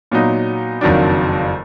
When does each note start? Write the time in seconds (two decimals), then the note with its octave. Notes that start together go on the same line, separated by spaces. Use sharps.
0.11 A#2 F#3 B3 D#4
0.81 F#1 F2 D#3 F#3 D4